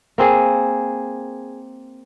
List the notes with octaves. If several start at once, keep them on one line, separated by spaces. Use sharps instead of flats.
A#3 C4 G#4